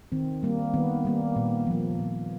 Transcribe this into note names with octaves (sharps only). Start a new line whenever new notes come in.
D#3 C4
G3 A#3
D#3 B3
G3 A#3
A#2
F3 A#3
A#2